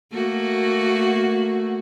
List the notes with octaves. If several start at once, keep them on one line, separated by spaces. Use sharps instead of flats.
A3 A#3 F#4